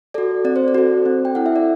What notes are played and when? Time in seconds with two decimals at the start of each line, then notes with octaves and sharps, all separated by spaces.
0.14 F#4 A4 D5
0.45 C4 D5
0.56 C5
0.68 D5
0.75 F#4 A4
1.06 C4
1.25 G5
1.35 E4 A4 F#5
1.46 E5
1.56 D5